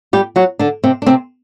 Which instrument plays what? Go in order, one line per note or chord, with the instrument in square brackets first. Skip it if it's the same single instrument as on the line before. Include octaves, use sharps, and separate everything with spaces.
[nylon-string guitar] G3 G4
F#3 F#4
D3 D4
C3 C4
D4
C3 C4